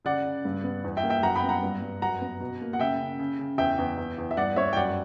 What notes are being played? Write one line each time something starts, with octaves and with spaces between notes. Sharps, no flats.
C#3 D5 F#5
C#3
G2
B3
E2
E5 G5
A#3
E5 G5
F#2 F#5 A#5
G5 B5
B3
F#5 A#5
G2
G2
F#2 F#5 A#5
B3
B2
A#3
F#5
C#3 E5 G5
C#3
C#3
C#3
E2 E5 G5
E2
E2
E2
E5
G2 D5 F#5
G2 C#5 E5
G5
F#2 D5 F#5